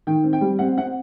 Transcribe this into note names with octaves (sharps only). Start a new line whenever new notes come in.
D#3 G5
C4
G5
G3
C4 F#5
C4 F#5